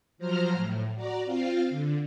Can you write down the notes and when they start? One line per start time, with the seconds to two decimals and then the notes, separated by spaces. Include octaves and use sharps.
0.18 F3 F#3 C5 A#5 F6
0.53 A2
0.95 F#4 D5 A#5
1.25 C4 F4 F5
1.69 D3